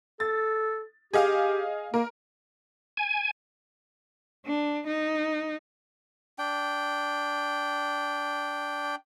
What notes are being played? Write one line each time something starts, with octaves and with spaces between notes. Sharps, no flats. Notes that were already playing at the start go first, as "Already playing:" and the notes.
A4 A6
G4 G#4 D#5 F5
A#3 A#4
G#5
D4
D#4
D4 G5